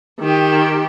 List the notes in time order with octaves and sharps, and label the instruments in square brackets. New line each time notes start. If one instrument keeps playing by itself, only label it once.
[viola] D#3 G4